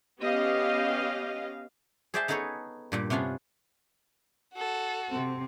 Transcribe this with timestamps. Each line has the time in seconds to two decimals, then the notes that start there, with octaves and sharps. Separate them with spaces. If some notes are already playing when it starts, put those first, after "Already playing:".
0.20 B3 C#4 G4 D#5 F5
2.14 G#4 C5 D5 E5 G5 A5
2.28 B3 D#4 G#4 A4 B4 C#5
2.92 G2 A#2 G3
3.10 C3 B3 C#4 D4 F4
4.54 F#4 A4
5.10 C3 C4